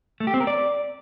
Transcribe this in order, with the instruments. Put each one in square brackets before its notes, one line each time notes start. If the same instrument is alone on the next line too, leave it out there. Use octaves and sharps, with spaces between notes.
[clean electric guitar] A3
G4
C4
A#4
D5